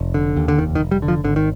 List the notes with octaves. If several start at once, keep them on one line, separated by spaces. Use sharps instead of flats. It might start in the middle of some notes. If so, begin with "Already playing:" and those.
Already playing: F1
D3
D#2
D3
F1 D#3
D#3
F1
G3
D3
F3
G#1 D3
D#3